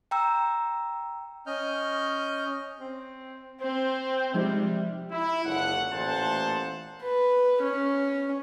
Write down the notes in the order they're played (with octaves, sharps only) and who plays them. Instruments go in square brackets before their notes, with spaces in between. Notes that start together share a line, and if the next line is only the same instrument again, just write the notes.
[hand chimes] G5 A#5 E6
[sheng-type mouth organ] C#4 D#5 F6 G6
[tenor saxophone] C4
[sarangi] C4 [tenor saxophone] C5
[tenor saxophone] C3 [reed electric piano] F3 G#3 D#4 [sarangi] G3
[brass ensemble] E4
F#1 C#2 D3 F#5
A1 A#2 A3 C5 F#5 A5
[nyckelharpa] B4
C#4